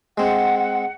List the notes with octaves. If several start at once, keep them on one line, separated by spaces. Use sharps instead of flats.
G#3 C4 F#5